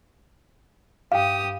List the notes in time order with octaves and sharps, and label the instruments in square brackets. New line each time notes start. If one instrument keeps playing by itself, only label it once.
[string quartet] G2 G4 D#6 [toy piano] F5 G5